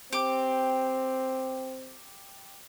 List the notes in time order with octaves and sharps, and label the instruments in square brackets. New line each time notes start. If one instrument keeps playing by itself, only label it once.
[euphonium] C4 [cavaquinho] G4 D6